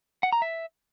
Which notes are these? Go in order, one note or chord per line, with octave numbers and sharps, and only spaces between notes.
F#5
A#5
E5